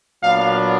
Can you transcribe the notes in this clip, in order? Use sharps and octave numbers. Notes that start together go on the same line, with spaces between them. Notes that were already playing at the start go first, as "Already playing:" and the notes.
A#2 F#3 B3 D4 F5